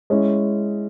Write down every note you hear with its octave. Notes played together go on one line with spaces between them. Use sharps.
G#3 C#4 E4